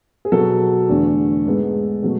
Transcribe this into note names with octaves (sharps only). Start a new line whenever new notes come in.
G#4
B2 F#3 B3 A4
E2 D3 A3
G#2 G#3 B3
B2 F#3 A3